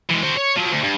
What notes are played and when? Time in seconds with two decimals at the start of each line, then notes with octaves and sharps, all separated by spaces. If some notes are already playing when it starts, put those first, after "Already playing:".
0.10 E3 G#3
0.23 F#4 C5
0.36 C#5
0.57 F3 F#3
0.71 D2
0.83 G2